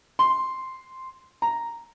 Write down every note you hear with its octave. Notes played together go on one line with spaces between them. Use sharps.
C6
A#5